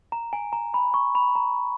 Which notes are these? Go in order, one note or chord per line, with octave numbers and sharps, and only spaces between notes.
A#5
G#5
A#5
B5
C#6
B5
A#5